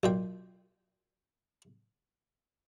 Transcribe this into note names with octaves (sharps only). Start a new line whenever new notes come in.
B1 A#2 G5